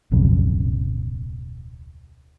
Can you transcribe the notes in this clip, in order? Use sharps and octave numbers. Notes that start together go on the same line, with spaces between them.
D1 B1 F2 C#3